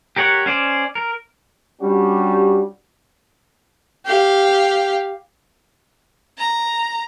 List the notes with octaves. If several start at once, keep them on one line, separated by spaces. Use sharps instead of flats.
G4 A#4 C#5 F#5
C#4 C5 D5
A#4
G3 C#4 D4 F#4 G4
G4 F5
A#5